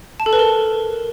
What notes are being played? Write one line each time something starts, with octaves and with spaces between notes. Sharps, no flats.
A5
A4
B4
A#4